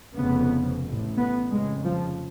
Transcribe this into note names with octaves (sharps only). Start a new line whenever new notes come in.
F1 F2 C#3 B3
A1 A2
B3
F1 F2 C#3 G#3
F3